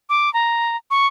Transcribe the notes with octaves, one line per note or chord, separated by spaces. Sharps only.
D6
A#5
C#6